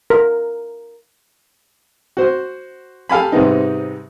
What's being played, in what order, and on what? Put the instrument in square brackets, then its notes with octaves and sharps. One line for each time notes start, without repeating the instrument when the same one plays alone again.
[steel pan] A#4
[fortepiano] F#4 C5
G4 A4 F5 G#5 B5
G#2 C3 G3 B3 D#4